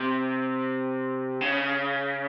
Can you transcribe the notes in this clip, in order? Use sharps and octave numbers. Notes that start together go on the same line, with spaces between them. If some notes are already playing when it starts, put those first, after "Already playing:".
Already playing: C3
C#3